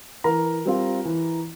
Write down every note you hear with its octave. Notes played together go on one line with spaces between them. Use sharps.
E3 A#4 A#5
G3 C4 F4
E3